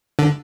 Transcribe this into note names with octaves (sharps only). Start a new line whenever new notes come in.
D3